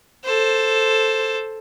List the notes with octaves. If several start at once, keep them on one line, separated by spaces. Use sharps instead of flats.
A4 C5